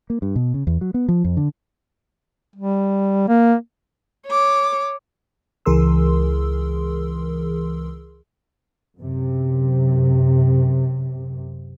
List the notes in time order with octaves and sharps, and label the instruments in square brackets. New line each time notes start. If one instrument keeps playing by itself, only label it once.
[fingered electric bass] A#3
G2
B2
C#3
E2
F#3
B3
F3
F2
D3
[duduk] G3
A#3
[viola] C#5 D6
[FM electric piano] C#2 E3 G#4 A#4 C6 E6
[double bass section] F#2 C3